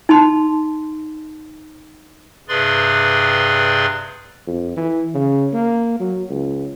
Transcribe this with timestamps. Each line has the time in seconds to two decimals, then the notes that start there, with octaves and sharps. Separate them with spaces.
0.09 D#4 A5 C6
2.49 G2 C3 G#4 B4 D5 C6
4.47 F2
4.76 E3
5.14 C#3
5.53 A#3
6.00 F#3
6.29 C#2